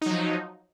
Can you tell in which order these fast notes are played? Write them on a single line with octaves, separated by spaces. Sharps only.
D#4 F#3 F3